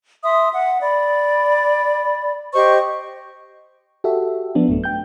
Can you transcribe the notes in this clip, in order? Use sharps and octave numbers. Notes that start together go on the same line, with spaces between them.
E5 C6 D#6
F#5
D5 B5
G4 C5 D#5 C#6
F#4 G4 A4 E5
F3 B3 D4
A1 F#2 A3
G5 G6